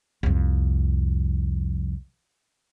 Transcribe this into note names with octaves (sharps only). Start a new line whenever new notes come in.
C2 F2